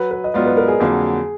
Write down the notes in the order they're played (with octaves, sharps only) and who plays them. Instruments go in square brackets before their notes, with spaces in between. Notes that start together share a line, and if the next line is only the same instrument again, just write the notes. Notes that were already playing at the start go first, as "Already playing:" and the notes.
Already playing: [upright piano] F#3 [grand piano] B4
[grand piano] B4
D#5
[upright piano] G#2 F#3 B3 F4 [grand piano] D5
[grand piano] B4
A#4
G#4
[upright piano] F2 D3 F#3 A#3